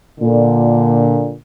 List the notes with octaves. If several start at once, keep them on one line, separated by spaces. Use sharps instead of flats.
A#2 D3